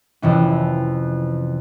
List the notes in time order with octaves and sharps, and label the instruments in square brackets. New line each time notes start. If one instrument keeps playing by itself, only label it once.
[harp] F2 C3 E3 C#4